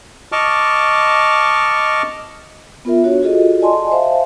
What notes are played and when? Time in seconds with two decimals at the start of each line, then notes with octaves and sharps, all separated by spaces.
0.32 D#5 A5 C#6 D6 F6
2.85 B3 F4 A#4 E5
3.04 D4 F#4 C#5
3.22 F4 F#4 G#4 A4 D#5
3.61 D5 D#5 G#5 A5 C6
3.92 C5 E5 F5 A5